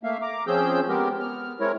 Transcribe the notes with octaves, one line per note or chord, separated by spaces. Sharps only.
A3 A#3 E5 F5
A#5 D6
F3 C4 C#4 G#4 E6 G6
G#3 B3 C4 G4 A#4
B3 F6
G#3 C4 E4 A#4 C#5